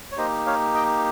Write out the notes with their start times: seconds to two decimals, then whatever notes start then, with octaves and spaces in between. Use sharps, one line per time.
0.12 C#5
0.17 A#3 D#4 G4 C5 D#5
0.47 C#5 F5
0.75 D#5 G5